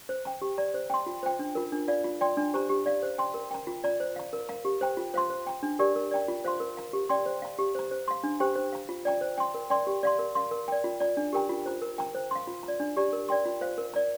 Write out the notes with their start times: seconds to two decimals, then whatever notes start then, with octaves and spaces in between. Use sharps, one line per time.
0.09 C5
0.25 G5 A#5
0.42 G4
0.58 D5 A#5
0.74 C5
0.90 G5 C6
1.07 F4
1.23 C5 G5
1.39 D4
1.55 F4 A#4
1.72 D4
1.88 F4 D5 F5
2.04 F4
2.21 D5 G5 C6
2.37 D4
2.54 G4 C5 A#5
2.70 G4
2.86 D5 F5
3.02 C5
3.18 G5 C6
3.34 A#4
3.51 G5 A#5
3.67 F4
3.84 D5 A#5
4.00 C5
4.16 F5 A#5
4.33 A#4
4.49 F5 A#5
4.65 G4
4.81 C5 G5 A#5
4.97 F4
5.14 C5 F5 C6
5.30 C5
5.47 G5 A#5
5.63 D4
5.79 G4 A#4 D5
5.96 A#4
6.11 D5 G5 A#5
6.28 F4
6.45 C5 F5 C6
6.60 A#4
6.77 F5 A#5
6.93 G4
7.09 D5 G5 C6
7.26 C5
7.42 F5 A#5
7.59 G4
7.75 C5 A#5
7.91 C5
8.08 F5 C6
8.24 D4
8.40 G4 C5 G5
8.56 C5
8.73 F5 A#5
8.89 F4
9.05 D5 G5 A#5
9.21 C5
9.38 G5 C6
9.54 A#4
9.70 D5 G5 C6
9.87 G4
10.03 D5 F5 C6
10.19 A#4
10.35 F5 C6
10.51 A#4
10.68 D5 G5
10.84 F4
11.00 D5 A#5
11.17 D4
11.33 G4 A#4 G5 A#5
11.49 F4
11.66 C5 A#5
11.82 A#4
11.98 G5 A#5
12.15 C5
12.31 F5 C6
12.47 F4
12.63 A#5
12.68 D5
12.80 D4
12.97 G4 D5 A#5
13.13 A#4
13.29 D5 G5 C6
13.46 F4
13.61 C5 F5
13.78 A#4
13.94 D5 A#5